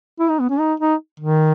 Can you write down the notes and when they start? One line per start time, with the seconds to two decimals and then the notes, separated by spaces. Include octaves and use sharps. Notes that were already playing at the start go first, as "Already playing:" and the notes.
0.19 E4
0.29 D#4
0.39 B3
0.49 C#4
0.60 D#4
0.80 D#4
1.20 D#3